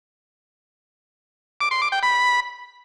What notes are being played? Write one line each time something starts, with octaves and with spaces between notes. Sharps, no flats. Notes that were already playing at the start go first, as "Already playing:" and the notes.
D6
C6
D6
G5
B5